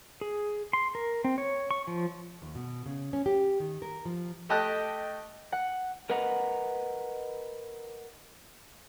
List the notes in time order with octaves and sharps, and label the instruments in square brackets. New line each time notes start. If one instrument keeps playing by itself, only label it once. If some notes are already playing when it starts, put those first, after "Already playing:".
[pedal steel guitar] G#4
C6
A#4
C4
C#5
C#6
F3
[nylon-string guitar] D#2
B2
C#3
C#4
G4
D#3
A#4
F3
[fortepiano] A3 G4 D#5 A5 F#6
[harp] F#5
[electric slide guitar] A#4 B4 D#5 F#5 A#5